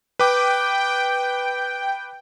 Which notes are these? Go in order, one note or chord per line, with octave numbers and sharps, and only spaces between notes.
B4 G5 D6